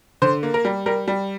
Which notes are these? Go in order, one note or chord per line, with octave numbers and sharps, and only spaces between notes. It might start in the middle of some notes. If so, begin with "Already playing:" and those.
D3 C5
A#3
A#4
G3
G3 A#4
G3